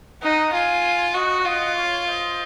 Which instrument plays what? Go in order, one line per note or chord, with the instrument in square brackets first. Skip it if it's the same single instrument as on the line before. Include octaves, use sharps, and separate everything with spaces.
[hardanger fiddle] D#4 [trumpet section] D#5 F#5
[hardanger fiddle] F4 [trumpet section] F5 G#5
[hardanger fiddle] F#4 [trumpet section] D#5 F#5
[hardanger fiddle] F4 [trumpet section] D#5 F#5
[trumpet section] C#5 F5
C5 D#5